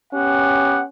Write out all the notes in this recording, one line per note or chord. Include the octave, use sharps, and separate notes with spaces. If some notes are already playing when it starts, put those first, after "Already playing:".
B3 C#4 G4 F#5